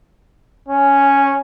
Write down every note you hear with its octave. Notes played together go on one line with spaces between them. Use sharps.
C#4